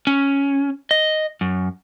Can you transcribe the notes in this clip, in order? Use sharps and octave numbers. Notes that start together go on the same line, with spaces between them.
C#4
D#5
F#2